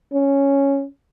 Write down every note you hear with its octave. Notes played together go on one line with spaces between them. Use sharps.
C#4